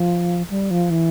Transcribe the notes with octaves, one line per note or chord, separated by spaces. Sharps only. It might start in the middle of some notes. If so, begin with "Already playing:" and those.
Already playing: F3
G3
F3
E3